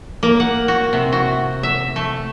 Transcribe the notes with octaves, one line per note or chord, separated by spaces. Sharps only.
A#3
F#5
F#4
C3
F#4
E5
A3